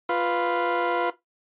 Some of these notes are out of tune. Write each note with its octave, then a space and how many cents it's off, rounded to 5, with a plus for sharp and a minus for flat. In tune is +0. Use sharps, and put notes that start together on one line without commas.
F4 +0 B4 +0